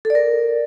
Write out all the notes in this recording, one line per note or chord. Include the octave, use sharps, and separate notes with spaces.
A4
D5
A#4